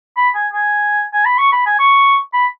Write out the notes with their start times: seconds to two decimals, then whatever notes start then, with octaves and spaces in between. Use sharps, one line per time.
0.17 B5
0.35 G#5
0.53 G#5
1.13 G#5
1.25 B5
1.38 C#6
1.52 B5
1.66 G#5
1.79 C#6
2.33 B5